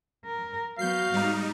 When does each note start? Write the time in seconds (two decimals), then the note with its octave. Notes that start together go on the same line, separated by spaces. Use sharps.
0.25 A#4
0.79 F#3 B3 F#4 F5 G6 C7
1.13 G#2 G3 D#4